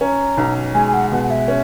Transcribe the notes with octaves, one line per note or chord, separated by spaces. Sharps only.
C#4 A#5
B1
G#3 G#5
G#5
F#5
B2 F#5
F#5
E5
C#4